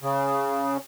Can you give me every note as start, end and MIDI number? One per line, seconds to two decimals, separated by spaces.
0.01 0.77 49